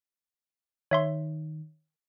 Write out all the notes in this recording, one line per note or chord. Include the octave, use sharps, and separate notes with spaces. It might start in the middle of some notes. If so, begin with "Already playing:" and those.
D#3 C#5 E5 C6